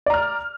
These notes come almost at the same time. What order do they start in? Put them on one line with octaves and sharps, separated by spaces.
D5 A#5 F6